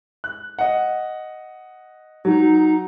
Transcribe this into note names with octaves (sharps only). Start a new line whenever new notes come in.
F#6
D#5 F#5
F#3 D#4